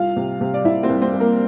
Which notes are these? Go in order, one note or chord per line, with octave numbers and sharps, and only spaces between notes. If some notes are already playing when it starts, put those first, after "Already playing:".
Already playing: C2 F4 F5
C3
C3
D5
C3 E4 E5
C4 C5
C2
C4 C5
C2
A#3 A#4